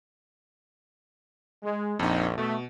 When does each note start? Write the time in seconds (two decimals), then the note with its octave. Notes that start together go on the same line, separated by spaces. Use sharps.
1.63 G#3
1.99 A#1 F2 D#4
2.38 B2 A3